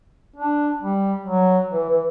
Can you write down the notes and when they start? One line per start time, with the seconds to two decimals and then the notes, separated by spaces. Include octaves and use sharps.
0.36 D4
0.82 G3
1.27 F#3
1.71 E3
1.89 E3